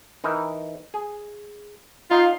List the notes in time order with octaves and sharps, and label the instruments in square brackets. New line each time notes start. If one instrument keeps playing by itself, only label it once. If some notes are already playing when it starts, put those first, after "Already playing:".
[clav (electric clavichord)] E3 D#4 A#4
G#4
[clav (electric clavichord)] D#4 [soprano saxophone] F4 [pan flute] F5